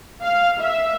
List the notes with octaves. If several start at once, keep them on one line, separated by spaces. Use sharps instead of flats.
F5
E5